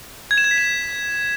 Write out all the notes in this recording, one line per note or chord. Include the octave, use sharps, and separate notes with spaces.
G#6
E7
G#6
B6
E7